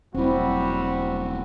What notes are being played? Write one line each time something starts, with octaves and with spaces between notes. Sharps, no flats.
E1 F#3 G3 C4 E4 F#4